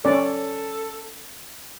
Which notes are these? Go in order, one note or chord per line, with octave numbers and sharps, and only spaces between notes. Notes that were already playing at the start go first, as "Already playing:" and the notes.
C#4 A4 D5